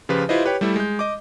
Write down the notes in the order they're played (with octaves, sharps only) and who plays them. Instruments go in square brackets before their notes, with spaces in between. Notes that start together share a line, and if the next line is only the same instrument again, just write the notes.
[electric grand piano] C#3 F3 F4 G4 B4
E4 F4 G4 B4 C5 D#5
G4 B4 C#5 G5
G3 A3 E4 E5
G#3 G6
D#5 D6